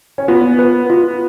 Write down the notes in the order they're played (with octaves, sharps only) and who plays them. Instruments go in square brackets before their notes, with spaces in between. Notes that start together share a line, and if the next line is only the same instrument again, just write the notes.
[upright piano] C#4
[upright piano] B3 [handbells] F4
[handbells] B4
F4